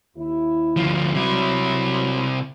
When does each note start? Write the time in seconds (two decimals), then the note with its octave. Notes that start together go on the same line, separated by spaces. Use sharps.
0.17 D#2 E4
0.76 D2 F3
1.14 C3 F#3 E4